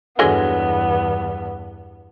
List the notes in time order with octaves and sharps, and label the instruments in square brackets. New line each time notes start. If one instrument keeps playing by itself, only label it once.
[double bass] E2 G2 [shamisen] D3 F#3 G#3 [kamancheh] B3